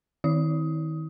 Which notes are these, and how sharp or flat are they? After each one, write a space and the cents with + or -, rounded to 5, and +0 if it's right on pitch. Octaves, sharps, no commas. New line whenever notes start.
D#3 +10 E4 -40 D#6 +20